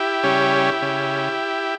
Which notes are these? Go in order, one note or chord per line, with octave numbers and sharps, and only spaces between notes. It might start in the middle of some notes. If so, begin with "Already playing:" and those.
Already playing: E4 G4
C#3 G3 C#4
C#3